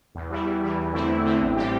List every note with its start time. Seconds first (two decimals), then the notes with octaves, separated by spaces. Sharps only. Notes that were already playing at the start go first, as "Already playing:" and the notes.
0.15 E2
0.30 E3 G3 E4
0.46 E2
0.62 E3 G3 E4
0.77 E2
0.93 D3 A3 C4 E4
1.09 E2
1.24 D3 A3 C4 E4
1.41 A1
1.56 A2 G3 C4 G4